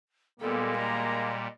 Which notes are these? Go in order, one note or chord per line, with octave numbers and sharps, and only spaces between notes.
A#2 G3 G#3 A#3 B3 A4
D#5 A#5